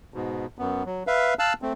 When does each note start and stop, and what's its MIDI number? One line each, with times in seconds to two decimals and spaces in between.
0.14 0.46 44
0.14 0.46 47
0.59 0.83 42
0.59 0.83 59
0.86 1.03 54
1.07 1.34 71
1.07 1.34 76
1.07 1.34 77
1.39 1.53 77
1.39 1.53 81
1.39 1.53 88
1.39 1.53 90
1.62 1.73 57
1.62 1.73 60